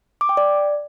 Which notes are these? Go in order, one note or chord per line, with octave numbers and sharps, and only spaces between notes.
D6
G5
D5